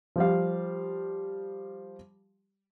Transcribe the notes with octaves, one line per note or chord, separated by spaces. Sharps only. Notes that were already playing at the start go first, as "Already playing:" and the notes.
F3 G3 F5